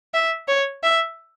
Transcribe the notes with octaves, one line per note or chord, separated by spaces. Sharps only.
E5
C#5
E5